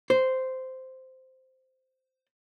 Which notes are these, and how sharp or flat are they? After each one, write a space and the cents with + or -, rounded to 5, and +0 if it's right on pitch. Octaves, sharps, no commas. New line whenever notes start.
C5 -10